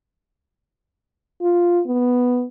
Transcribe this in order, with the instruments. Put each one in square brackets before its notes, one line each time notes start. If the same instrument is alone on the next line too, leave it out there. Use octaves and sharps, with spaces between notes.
[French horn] F4
B3